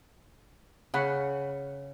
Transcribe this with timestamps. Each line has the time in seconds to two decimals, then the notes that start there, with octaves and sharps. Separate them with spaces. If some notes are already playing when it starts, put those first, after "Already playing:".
0.94 C#3 C#5 F#5 B5